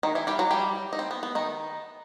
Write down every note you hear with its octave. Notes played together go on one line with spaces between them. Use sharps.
D#3 D#4
E3 E4
G3 G4
F#3 F#4
G3 G4
D#4
C4
B3
B3
D#3 D#4